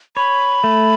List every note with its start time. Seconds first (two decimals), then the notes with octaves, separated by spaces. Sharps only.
0.16 C#5 B5
0.64 A3